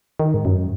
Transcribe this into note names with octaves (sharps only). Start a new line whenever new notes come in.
D#3
G#2
F#2